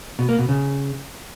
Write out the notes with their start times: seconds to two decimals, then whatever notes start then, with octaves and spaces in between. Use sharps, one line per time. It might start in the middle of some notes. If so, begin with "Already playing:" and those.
0.19 B2
0.29 A#3
0.39 B2
0.49 C#3